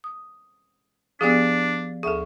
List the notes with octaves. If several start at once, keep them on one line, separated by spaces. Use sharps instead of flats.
D#6
F3 B3 D4 G4 G#4 D5
D2 G#4 A4 E5 C#6